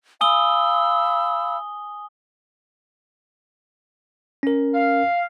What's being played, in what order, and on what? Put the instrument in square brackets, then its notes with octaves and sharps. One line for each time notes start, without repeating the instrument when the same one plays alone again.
[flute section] F5 B5 E6 [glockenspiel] G#5 D#6 G7
[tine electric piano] C#4 A#4
[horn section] F5